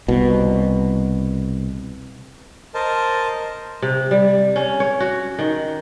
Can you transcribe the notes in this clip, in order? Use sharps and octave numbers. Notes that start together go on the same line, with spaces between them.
C2 B2
A#4 C5 D#5 A5
C3
G3
C#4
C#5
F#4
D#3